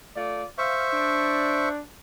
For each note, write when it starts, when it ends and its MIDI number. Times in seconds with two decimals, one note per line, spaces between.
0.16 0.44 57
0.16 0.44 65
0.16 0.44 74
0.58 1.69 72
0.58 1.69 76
0.58 0.92 77
0.58 1.69 85
0.93 1.83 62